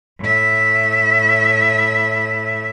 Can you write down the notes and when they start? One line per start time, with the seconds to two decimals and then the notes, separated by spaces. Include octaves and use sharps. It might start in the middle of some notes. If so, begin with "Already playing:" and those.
0.21 A2 E5